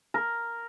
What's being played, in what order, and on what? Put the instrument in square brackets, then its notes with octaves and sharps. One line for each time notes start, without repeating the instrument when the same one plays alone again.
[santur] A#4